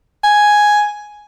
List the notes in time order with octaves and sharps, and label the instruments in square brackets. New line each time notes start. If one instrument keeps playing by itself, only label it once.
[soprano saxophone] G#5